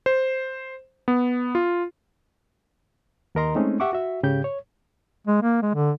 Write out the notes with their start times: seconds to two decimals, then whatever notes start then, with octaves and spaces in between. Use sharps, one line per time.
0.06 C5
1.08 B3
1.55 F4
3.35 D#2 D#3 A#4 D#5 A#5 C6
3.55 G#3 A3 C4 C#4 D#4
3.80 G4 E5 F#5 C#6 D6
3.93 F#4 E5
4.23 G#2 C#3 G4 G6
4.44 C#5
5.27 G#3
5.42 A#3
5.62 G#3
5.74 D3